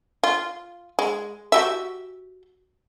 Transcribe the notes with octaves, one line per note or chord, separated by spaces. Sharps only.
F4
G#3
F#4 G4 E5